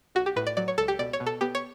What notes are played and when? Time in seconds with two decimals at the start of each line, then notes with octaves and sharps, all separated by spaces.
0.15 B1 F#4
0.26 G4
0.36 A2 B4
0.47 D5
0.57 F#3 D5
0.68 C#5
0.78 C#2 A4
0.88 G4
0.99 B2 D5
1.13 C#5
1.20 B2
1.26 A4
1.41 B3 G4
1.55 C#5